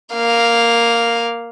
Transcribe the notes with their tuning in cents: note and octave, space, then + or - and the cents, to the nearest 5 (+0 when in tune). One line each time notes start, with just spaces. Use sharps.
A#3 +0 F5 +0